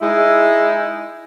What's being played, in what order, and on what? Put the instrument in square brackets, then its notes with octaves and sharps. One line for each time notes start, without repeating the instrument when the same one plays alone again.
[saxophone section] G#3 D#4 E4